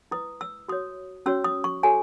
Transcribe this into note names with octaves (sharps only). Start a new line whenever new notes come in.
E4 B4 D#6
E6
F#4 C#5 D#6
C#4 F#4 C#5 E6
D#6
C#6
F#4 A4 C#5 G#5